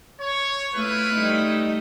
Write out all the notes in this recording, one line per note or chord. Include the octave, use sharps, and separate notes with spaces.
C#5
A3 E4 F4 B4
G3 A3 D#4